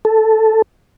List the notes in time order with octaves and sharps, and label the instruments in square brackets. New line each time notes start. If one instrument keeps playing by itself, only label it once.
[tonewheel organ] A4